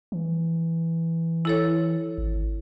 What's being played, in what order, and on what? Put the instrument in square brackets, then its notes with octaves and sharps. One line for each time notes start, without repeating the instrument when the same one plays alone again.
[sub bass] E3
[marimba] E4 A4 C#5
[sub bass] G#1